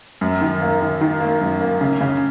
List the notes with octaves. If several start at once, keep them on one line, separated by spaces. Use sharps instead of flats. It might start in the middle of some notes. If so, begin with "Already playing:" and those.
F#2
D#3
A#3
D#3
D#3
A#3
F#2
A#3
C#3
C#3